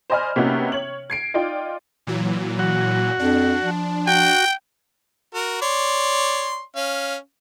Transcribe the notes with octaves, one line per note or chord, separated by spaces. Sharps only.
C5 D5 D#5 G#5 B5 F6
C3 A#3 B3 C#4 D#4 F#4
C#5 F#7
G#6 C7 D7
D#4 F4 D5 G5
A#2 E3 F#3
F#4
F2 D4
F3
F#4 G5
F#4 A#4
C#5 D5 C6
C#4 F5